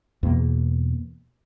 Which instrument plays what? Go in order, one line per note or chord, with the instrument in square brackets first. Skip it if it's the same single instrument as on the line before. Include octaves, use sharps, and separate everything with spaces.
[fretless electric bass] E2 B2 A#3